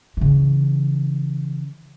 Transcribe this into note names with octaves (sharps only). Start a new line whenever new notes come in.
C#3 E3